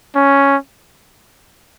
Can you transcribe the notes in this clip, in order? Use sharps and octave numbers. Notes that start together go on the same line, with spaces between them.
C#4